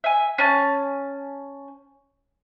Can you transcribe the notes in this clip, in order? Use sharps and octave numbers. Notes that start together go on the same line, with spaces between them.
E5 G#5
C#4 G#5 A5